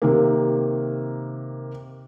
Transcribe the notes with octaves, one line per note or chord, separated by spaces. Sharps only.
C3 D#3 A#3